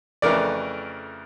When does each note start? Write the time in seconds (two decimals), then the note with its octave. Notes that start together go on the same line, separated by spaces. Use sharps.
0.22 F2 C#3 E3 A3 A#4 D5